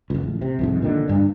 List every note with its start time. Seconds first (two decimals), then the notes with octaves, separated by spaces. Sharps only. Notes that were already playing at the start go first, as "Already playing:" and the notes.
0.10 F#1 C#2
0.23 A1
0.42 C3
0.59 C2 F2 G#2
0.82 A#2 D3 D#3
1.08 G2 D4